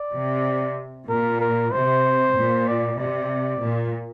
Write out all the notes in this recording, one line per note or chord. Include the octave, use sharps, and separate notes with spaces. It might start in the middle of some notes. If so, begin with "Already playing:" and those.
Already playing: D5
C3
A#2 A#4
A#4
C3 C5
A#2
D5
C3 D5
A#2